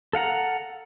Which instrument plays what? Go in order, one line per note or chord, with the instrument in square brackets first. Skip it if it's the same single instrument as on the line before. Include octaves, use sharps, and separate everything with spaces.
[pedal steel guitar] A4 F5 F#5 A#5